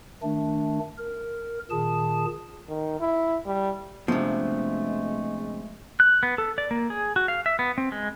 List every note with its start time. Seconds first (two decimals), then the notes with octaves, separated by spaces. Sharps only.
0.22 D#3 A3 D4
0.98 A#4
1.71 A#2 D#3 G#4 A5
2.69 D#3
3.00 E4
3.46 G3
4.08 C3 F3 G#3 A3 B3 C4 D4
6.00 F#6
6.23 B3
6.38 A4
6.58 D5
6.71 A#3
6.90 G#4
7.16 F#4
7.28 F5
7.46 E5
7.59 B3
7.78 C4
7.92 G#3